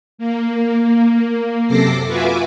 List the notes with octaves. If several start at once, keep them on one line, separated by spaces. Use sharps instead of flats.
A#3
F#2 C3 A4 D6 A#6 C7
F4 F#4 B4 E5 G#5 D6